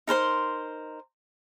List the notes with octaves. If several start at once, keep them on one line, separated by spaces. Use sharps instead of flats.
D#4 A#4 C5 C6